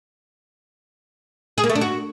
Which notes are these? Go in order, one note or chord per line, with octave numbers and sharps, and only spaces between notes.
G#4
A#3
A3
D4
F#4